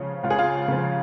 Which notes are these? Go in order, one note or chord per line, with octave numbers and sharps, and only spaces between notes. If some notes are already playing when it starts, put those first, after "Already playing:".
Already playing: C#2 C#3 F3 C#4
C#2 F4
G#4
F4
C#3 F3